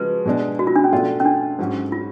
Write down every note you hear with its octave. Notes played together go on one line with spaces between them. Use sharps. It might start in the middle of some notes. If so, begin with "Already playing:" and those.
Already playing: C#3 F3 G#3 F#4 B4
B2 G#3 D4
F#4
F4
D4
C#4
B2 A3 D4 F4
C#4
D4
G#2 F#3 C#4
F4